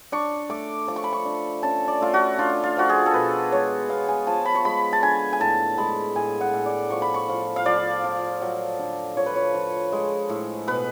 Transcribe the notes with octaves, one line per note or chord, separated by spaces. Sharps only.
D4 C#6
A3 D6
F3 D6
C#6
B5
C#6
D4
C#4 A5
D5
A3 F4
F#4
D4 F4
F4
F3 F#4
G#4
A4
B2 B4
G#3 C#5
B3 F5
G#5
F3 A5
B5
C#6
G#3 B5
A5
D3 G#5
G#5
A2 A5
G#3 B5
A2 G#5
F#5
A2
D5
F3 C#6
B5
C#6
F3
F5
F3 D5
F3
F#3
D3
F3 C#5
B4
C#5
F3
G#3
A2
B2 B4